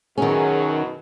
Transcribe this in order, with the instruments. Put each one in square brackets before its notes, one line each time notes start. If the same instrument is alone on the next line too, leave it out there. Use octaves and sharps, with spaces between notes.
[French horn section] F#2 B2 F#3 [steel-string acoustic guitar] D#3 C#4 [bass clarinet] G#4